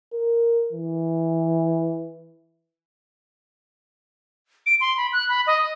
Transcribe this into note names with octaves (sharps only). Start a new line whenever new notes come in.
A#4
E3
D7
C6
B5
F#6
B5
D#5